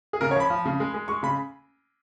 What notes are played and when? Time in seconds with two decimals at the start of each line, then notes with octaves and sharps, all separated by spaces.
0.13 G#4
0.21 C#3 A#4
0.31 C#5
0.36 F3 B5
0.50 F3
0.66 C#3
0.80 G#3
0.94 G#3
1.08 G#3 C#6
1.23 C#3 B5